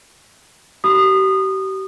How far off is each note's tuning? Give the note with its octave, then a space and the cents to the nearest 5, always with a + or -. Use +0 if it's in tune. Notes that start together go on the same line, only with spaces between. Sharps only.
G4 -40 B5 +0 D#6 -25